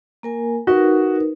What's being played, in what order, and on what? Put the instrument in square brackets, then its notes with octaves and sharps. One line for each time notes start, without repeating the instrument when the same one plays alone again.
[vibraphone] A#3 A#4 G#5
[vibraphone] D#4 A#4 B4 [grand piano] F#4